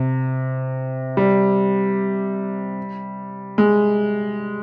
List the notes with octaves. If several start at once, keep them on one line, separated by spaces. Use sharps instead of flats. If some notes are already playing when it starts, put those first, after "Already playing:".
Already playing: C3
G3
G#3